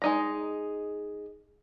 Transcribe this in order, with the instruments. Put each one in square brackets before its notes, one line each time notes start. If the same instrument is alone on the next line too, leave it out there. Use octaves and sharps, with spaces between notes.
[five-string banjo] G#3 D#4 A#5